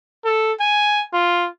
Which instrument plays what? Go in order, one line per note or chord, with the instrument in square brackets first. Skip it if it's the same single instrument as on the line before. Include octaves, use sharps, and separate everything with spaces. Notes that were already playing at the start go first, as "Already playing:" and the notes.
[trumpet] A4
G#5
F4